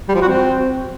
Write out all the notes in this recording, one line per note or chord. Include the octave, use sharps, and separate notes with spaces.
G3
F3
F#4
C4